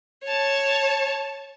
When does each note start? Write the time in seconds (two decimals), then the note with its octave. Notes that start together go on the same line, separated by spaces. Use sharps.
0.24 C#5 A5